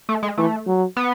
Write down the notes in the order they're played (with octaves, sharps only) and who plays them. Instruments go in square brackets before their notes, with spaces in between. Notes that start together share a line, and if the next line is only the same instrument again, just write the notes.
[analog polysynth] A3
G#3
[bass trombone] E3 [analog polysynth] A3
[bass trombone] F#3
[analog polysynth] B3